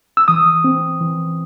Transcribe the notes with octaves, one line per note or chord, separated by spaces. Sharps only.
E6
E3 D#6
C4
E3